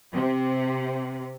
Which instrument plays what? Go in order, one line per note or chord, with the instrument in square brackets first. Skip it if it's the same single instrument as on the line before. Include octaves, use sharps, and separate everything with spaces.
[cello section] C3